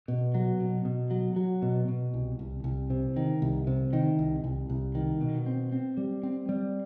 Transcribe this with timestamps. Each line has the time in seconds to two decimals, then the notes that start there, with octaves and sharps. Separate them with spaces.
0.08 B2
0.35 F#3
0.60 B2
0.85 B2
1.11 F#3
1.36 F#3
1.62 B2
1.88 B2
2.14 C2
2.39 C2
2.64 C2
2.90 C3
3.16 D#3
3.42 C2
3.67 C3
3.93 D#3
4.19 C2
4.44 C2
4.70 C2
4.95 D#3
5.21 B2
5.46 C4
5.72 C4
5.97 G3
6.23 C4
6.49 G3